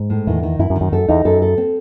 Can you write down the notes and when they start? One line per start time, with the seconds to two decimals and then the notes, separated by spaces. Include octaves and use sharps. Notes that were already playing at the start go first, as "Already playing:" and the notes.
Already playing: G#2
0.10 A2
0.27 E2 D#3
0.43 D#3
0.59 F#2 E4
0.70 F#2
0.76 D#3
0.81 F#2
0.92 F#2 A4
1.08 E2 D#4
1.25 F#2 A4
1.42 A4
1.58 C4